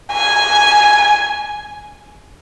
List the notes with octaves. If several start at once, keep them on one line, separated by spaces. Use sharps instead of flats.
G#5